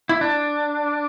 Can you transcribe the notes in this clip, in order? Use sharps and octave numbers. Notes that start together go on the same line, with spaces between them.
E4
D4